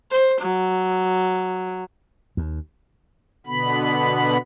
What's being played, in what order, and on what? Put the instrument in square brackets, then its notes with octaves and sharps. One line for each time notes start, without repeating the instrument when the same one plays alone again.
[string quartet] C5
F#3
[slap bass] D#2
[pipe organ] B2 D3 B3 B5